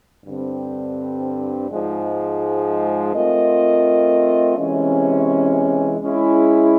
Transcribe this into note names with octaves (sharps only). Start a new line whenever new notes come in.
G2 D3 G3 C4
G#2 F3 G#3
A3 C4 F4 A#4 D#5
C3 E3 G#3 C#4
G#3 C#4 E4 G#4